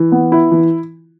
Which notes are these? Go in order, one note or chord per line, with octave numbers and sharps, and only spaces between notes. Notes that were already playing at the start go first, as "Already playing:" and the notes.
Already playing: E3
B3
E4
E3